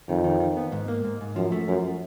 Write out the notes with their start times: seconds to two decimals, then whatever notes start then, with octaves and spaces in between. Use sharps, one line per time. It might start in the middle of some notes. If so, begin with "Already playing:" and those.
0.09 F2 D#3
0.24 D#3
0.40 D#3
0.57 B3
0.72 G#2
0.88 A#3
1.04 G#2
1.21 G#2
1.36 F#2 F3
1.52 A3
1.68 F#2 F3